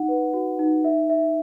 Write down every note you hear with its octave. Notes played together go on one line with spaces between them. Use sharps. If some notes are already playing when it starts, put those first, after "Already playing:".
Already playing: D#4 F#5
B4
F#4
D#4
E5
E5